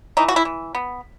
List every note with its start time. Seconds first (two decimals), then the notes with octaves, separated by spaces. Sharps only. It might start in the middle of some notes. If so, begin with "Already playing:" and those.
0.17 E3 D#4
0.28 F#4
0.36 E4
0.45 E3
0.75 B3